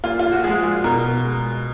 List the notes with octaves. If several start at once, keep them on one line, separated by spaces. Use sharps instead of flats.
A#2 F4
F4
F#4
F3 G#3 G#4
B2 A#4
G#3